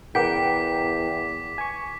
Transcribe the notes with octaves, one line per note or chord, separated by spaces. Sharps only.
E2 A#4 B4 F#5 G5 D6 B6
G#5 C#6